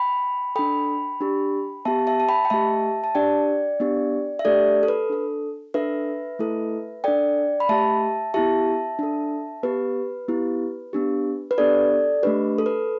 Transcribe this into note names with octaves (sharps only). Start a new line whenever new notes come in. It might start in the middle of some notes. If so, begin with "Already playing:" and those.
Already playing: G5 B5
D4 A4 G5 B5
D4 G4
B3 G4 E5 A5
E5 A5
A5
G5 B5
G5
A3 G4 E5 A5
A5
D4 G4 D5 G5
B3 D4 G4
E5
A3 D4 G4 A4 D5
A4
B4
D4 A4
D4 A4 B4 E5
A3 E4 A4
D4 A4 D5 G5
B5
A3 G4 E5 A5
B3 E4 G4 E5 A5
D4 A4
B3 G4 B4
B3 E4 G4
B3 D4 G4
B4
B3 D4 G4 A4 D5
A3 D4 G4 B4
A4
B4